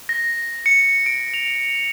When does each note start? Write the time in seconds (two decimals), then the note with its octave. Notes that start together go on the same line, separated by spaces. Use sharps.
0.09 A#6
0.66 C#7
1.06 D7
1.34 F7